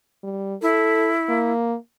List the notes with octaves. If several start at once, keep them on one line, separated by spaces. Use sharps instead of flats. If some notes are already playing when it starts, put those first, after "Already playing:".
G3
E4 A4
A#3